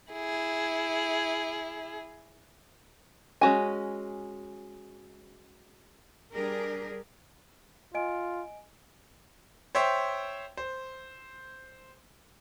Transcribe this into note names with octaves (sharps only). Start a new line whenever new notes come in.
E4 G#4
G#3 C#4 F#4 G#5
G3 D4 G4 G#4 A#4
F4 D#5 G#5 D7
C5 C#5 E5 G5 C6
C5